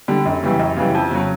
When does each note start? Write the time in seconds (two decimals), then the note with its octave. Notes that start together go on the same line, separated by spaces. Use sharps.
0.08 D3 G3
0.25 F#2
0.43 C#3 E3 G3
0.59 F#2
0.76 C#3 E3 G3
0.94 F2
1.11 C#3 F#3